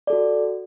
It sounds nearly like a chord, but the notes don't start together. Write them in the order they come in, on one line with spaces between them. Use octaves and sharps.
D5 A4 F#4